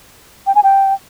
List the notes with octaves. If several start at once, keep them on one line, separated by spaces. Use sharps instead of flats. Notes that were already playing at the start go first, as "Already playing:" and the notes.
G5
G#5
G5